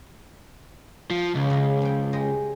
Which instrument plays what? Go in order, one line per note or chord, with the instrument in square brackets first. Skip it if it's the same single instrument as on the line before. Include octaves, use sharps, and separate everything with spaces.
[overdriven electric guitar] F3
[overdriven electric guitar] C#2 [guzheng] C#3
[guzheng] C#3 D#5
F3 G5
G#3 G4 D#5